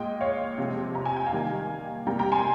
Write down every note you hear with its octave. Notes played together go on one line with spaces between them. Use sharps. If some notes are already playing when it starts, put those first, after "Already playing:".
Already playing: A#2 G#3 D#5 G5
C#5 F5
C3 F3 G#3
A#5
G#5
G5
F5 G#5
D#3 G3 A#3
C3 G3 A#3 G5 A#5
G5 A#5
G#5 C6